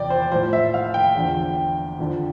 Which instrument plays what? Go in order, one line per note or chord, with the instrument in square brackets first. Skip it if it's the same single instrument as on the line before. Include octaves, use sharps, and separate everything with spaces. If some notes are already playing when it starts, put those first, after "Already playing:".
Already playing: [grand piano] E2 C3 F3 D5 G5
C5
A2 F3 C5
E5
F5
G5
E2 D3 F3
F2 D3 F3